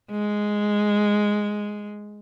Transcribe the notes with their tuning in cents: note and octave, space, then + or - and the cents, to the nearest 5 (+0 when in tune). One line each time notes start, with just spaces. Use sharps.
G#3 +0